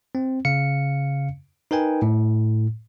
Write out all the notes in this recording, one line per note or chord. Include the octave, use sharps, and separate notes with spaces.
C4
C#3 F5 C#7
D#4 A#4 B4 G5 G#5
A2